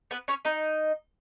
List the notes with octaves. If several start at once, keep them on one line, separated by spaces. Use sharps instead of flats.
B3 B4
C#4 C#5
D#4 D#5